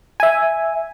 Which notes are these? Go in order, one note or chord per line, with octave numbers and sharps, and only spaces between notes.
E5 G#5